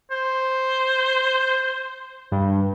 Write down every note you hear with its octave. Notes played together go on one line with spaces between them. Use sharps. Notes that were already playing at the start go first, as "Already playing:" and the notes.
C5
G2